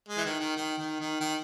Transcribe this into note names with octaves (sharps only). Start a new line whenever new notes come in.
G#3
E3
D#3
D#3
D#3
D#3
D#3
D#3